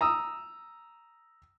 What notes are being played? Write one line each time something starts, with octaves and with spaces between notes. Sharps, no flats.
A#5 D#6 E6